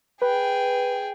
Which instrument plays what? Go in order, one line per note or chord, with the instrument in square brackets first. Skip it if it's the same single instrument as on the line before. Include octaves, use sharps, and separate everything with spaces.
[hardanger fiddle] G#4 G5 [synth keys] B4